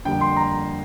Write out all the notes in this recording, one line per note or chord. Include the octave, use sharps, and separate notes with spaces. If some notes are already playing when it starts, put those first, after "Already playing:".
F2 D3 G3 A#3 D4 G5
C6
A#5